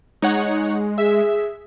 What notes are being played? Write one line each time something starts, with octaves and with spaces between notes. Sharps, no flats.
G#3 D#4 C#5 F#5
G#4 E5